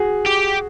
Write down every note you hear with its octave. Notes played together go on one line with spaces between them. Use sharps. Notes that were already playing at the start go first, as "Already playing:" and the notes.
Already playing: F#4 G#4
G4